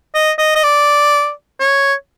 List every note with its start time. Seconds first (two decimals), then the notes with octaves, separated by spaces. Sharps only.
0.15 D#5
0.39 D#5
0.56 D#5
0.63 D5
1.60 C#5